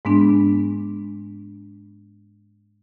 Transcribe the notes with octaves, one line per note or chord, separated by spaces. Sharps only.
G#2 G#3 B3 D4